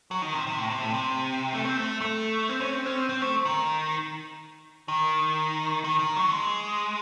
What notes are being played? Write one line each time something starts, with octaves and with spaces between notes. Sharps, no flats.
F#3
D#3
C3
C3
A2
C3
A2
C3
A3
C4
A3
A3
C4
C#4
C4
C#4
C4
C4
A3
D#3
D#3
D#3
D#3
F#3
G#3